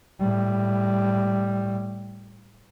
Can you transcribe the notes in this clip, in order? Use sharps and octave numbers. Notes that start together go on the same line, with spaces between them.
A2 G3